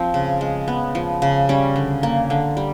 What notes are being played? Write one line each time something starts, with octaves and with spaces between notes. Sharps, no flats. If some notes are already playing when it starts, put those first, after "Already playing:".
Already playing: F3 C4
C#3
G#3
B3
F3
C#3
G3 C#4
D3
A#3
D3
G3